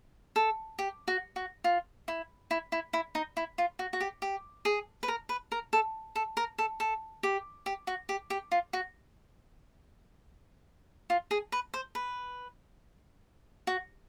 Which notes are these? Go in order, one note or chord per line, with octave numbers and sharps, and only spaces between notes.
A4
G4
F#4
F#4
F4
E4
E4
E4
E4
D#4
E4
F4
F#4
F#4
G4
G4
G#4
B4
A#4
B4
A#4
A4
A4
A#4
A4
A4
G4
G4
F#4
G4
G4
F4
F#4
F4
G#4
B4
C5
B4
F#4